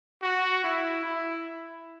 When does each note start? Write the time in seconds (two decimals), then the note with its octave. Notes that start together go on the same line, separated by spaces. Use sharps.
0.22 F#4
0.64 E4
1.05 E4